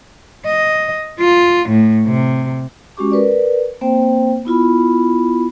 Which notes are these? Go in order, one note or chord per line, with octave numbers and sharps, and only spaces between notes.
D#5
F4
A2
C3
G#3 C#4 F#4 G4 C#6 D6
A#4 B4 D5
A#3 C4 C5 G5
B3 E4 F4 B5